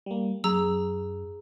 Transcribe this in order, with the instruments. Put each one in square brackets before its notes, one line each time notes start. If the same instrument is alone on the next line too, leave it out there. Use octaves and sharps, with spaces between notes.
[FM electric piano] G3 A#3
[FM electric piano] F#2 [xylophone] G#4 A#5 E6